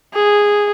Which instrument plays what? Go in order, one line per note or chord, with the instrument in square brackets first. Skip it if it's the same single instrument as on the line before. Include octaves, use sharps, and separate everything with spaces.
[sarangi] G#4